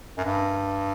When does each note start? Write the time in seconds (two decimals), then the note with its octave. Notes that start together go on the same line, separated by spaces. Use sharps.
0.18 F#2
0.24 G2